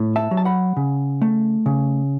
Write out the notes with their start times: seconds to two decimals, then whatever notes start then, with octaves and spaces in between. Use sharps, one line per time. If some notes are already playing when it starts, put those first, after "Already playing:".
Already playing: A2
0.16 E5 A5
0.31 F#3
0.37 A5
0.45 F#5 B5
0.77 C#3
1.22 A3
1.66 C#3